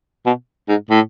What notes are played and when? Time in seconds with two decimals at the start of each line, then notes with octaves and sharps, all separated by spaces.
0.26 B2
0.69 G#2
0.90 A2